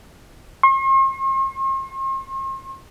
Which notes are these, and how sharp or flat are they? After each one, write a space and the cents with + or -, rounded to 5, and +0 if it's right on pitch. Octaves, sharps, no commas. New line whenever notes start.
C6 +45